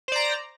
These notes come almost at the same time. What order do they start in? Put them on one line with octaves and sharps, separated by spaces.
C5 D5 A#5